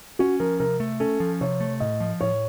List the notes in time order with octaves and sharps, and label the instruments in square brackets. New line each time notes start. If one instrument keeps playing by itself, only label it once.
[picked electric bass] C#4 [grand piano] F#4
[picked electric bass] F3 [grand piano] A#4
[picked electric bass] C3 [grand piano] A#4
[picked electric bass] A3
[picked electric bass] C#4 [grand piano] A4
[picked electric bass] F3
[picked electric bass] C3 [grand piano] C#5
[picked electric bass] A3
[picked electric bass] A2 [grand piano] D#5
[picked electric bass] F3
[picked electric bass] A2 [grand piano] C#5